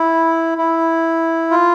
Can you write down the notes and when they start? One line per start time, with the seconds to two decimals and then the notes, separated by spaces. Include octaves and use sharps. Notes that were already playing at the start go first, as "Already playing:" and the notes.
Already playing: E4
0.58 E4
1.51 F4